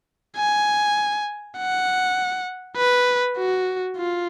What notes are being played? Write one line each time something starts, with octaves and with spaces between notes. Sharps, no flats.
G#5
F#5
B4
F#4
F4